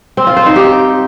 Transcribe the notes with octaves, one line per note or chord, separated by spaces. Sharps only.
C4
F4
C5
D#4
G4